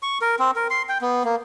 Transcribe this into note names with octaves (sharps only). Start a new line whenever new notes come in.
C#6
A#4
C4
A#4
C6
G5
B3
A#3